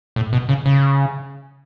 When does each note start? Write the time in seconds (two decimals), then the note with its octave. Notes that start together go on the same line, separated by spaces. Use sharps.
0.16 A2
0.33 B2
0.49 C#3
0.66 C#3